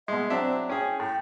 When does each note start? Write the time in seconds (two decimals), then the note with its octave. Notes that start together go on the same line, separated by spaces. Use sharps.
0.08 B2 G#3 E5
0.30 F#3 C4 D4 E5
0.69 C#4 G#4 G5
1.00 A2 G5